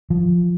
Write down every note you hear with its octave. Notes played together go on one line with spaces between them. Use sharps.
F3